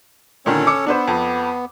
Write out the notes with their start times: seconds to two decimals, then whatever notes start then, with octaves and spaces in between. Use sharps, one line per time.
0.46 A#2 D3 D#3 C#4 A4 C#5
0.67 D6 E6 C#7
0.87 B3 D4 B4 C5
1.07 F2